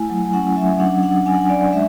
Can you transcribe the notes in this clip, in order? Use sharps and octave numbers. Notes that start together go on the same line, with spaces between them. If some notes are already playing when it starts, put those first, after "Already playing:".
Already playing: A3 E4 G#5
F#3
G#5
C#4 F#5
F#3 E5
D4 F#5
D4 F#5
D4 G#5
F#5
G#5
D4 D5
G#3 E5